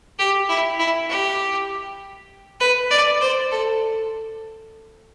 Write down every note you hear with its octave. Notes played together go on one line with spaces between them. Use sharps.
G4
E4
E4
G4
B4
D5
C5
A4